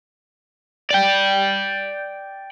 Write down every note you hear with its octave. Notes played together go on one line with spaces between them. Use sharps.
D5 G5